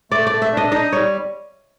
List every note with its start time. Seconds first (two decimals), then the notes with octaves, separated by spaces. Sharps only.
0.12 A3 D5
0.27 D5
0.32 A3
0.42 E5
0.52 D4
0.57 D#5
0.72 D#4 D#5
0.92 G3 C#5